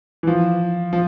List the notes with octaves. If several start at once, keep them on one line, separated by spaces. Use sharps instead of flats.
E3
F3
F3